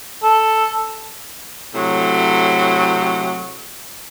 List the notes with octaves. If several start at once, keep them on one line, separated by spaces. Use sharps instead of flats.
A4
A2 C3 F#3